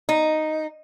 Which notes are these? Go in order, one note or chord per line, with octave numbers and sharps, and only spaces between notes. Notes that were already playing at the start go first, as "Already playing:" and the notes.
D#4